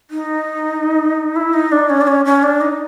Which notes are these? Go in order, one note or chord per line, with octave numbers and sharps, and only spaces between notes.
D#4
E4
D#4
D4
C#4
D4
C#4
C#4
D4
D#4